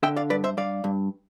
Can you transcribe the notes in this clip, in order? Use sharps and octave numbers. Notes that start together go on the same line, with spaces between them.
D3 E5 G5
D5 F5
G2 B4 D5
C5 E5
G2 D5 F5
G2